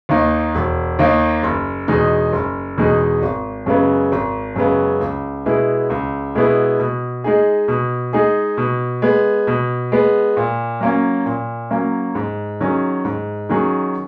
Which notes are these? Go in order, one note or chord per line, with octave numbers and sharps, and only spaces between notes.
D#2 D#3 A#3 D#4
E1
D#2 D#3 A#3 D#4
F#1
E2 B2 G#3 D#4
F#1
E2 B2 G#3 D#4
G#1
F#2 C#3 G#3 B3
G#1
F#2 C#3 G#3 B3
C#2
B2 G#3 B3 E4
C#2
B2 G#3 B3 E4
B2
G#3 D#4 G#4
B2
G#3 D#4 G#4
B2
G#3 B3
B2
G#3 B3
A#2
F#3 A#3 C#4
A#2
F#3 A#3 C#4
G#2
D#3 F#3 C#4 G#4
G#2
D#3 F#3 C#4 G#4